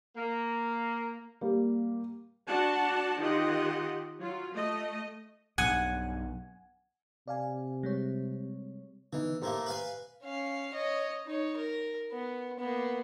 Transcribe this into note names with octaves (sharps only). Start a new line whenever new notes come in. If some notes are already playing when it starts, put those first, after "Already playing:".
A#3
G3 A#3
D4 F#4 F#5 A5
D#3 F4 G4 D#5 F#5
F#3 F4
A3 D#5
B1 G2 F#5 G#5
C3 D5 F5 G#5
G3 G#3 C#5
D3 E3 B3 D#4
A2 A3 A#3 G4 C5 A#5
B4 F5 G#5
C#4 F5
C#5 D#5
D#4 C#5
A#4
B3
A#3 B3